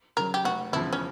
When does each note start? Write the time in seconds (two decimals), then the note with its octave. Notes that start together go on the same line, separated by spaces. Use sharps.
0.17 C#3 F#3 A#4
0.34 G4
0.45 F1 F#4
0.72 E2 C#3 F3 E4
0.93 C#4